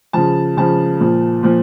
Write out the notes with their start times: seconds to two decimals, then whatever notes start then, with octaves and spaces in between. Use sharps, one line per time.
0.13 C#3 F3 A5
0.57 C#3 F3 A5
1.00 A#2 F3
1.43 A#2 F3